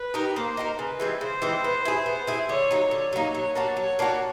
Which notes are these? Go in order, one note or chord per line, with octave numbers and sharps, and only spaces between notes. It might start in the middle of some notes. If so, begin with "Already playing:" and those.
Already playing: B4
D#4 G4 A#4
A#3 C5
D#4 G4 A#4
C#3 B4
E3 G#3 C4
C#3 C5
E3 G#3 C4
B3
E4 G#4
B3
E4 G#4
D3 C#5
F#3 A#3 D#4
D3 C#5
F#3 A#3 D#4
F#3 C#5
A#3 D4 F#4
F#3 C#5
A#3 D4 F#4